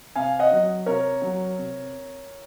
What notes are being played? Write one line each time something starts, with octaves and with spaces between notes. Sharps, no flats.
C3 F5 G#5
D#5 F#5
F#3
C3 A#4 C#5
F#3
C3